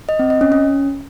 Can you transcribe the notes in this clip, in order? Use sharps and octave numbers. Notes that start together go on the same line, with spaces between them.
D#5
C4
D#5
C#4
C#4